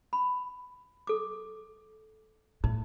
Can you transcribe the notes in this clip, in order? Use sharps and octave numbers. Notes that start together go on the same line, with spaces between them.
B5
A4 D6
A2 D#4